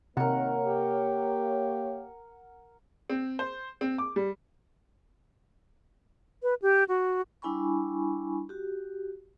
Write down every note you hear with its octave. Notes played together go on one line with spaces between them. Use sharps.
C3 D#3 A#3 A#4 C#5 F#5
G4
C4
C5
C4
D6
G3
B4
G4
F#4
G3 D4 E4 G#5 B5 C#6
F#4 G4